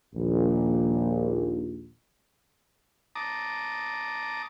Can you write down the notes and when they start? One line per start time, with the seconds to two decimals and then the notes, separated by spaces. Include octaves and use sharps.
0.15 A#1 D#2
3.16 A5 A#5 D6 D#6